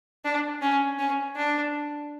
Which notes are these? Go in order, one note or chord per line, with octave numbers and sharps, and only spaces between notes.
D4
C#4
C#4
D4